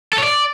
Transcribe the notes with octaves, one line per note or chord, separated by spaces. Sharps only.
A4
C#5
D5